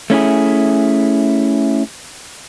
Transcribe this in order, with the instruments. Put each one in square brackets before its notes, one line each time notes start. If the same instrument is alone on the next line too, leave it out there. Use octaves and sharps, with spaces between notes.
[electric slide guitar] A3 C#4 E4 G#4